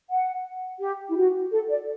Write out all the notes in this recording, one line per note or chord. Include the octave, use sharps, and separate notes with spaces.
F#5
G4
E4
F#4
A4
D5